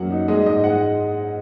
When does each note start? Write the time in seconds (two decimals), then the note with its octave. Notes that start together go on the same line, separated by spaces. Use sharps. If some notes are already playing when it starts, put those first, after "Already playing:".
Already playing: F#2 F#3 A#3 F#5
0.10 D#4
0.28 G#3 D#5
0.46 G#2 D#5
0.63 G#3 F#5